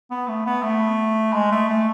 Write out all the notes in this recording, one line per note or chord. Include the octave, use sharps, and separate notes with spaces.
B3
A3
B3
A3
G#3
A3
A3